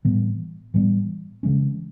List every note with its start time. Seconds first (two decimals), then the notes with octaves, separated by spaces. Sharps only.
0.05 A2 E3 G3 B3
0.74 A2 E3 G3 B3
1.43 C#3 E3 G#3 C#4